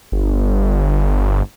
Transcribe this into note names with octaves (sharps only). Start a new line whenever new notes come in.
G1